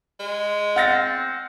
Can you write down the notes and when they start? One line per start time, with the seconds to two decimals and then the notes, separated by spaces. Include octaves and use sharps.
0.20 G#3
0.76 C4 F#5 F6 A6 A#6